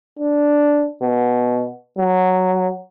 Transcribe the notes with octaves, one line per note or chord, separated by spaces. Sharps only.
D4
B2
F#3